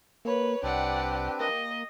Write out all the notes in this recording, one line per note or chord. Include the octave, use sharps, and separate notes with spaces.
A#3 B4 C#5
C2 C4 D4 G4 B4 D5 F#5
A#3 D#5